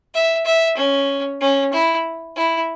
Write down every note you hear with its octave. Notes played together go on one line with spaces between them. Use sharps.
E5
E5
C#4
C#4
E4
E4